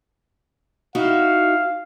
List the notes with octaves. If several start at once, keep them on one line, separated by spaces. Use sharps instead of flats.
D#4 E4 F#4 F5